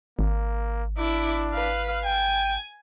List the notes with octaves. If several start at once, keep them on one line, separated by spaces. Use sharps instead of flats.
G#1 A#3
D4 E4 D6
B4 F5
G5 G#5